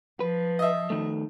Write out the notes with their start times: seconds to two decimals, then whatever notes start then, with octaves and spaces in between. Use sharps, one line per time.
0.20 F3 B4
0.59 D#5 E5
0.90 D#3 A3